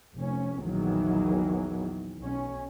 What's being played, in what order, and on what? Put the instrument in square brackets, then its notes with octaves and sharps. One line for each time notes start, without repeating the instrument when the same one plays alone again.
[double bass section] F1 C#4
A#1 E2 D#3 E3 F#3
B1 C#4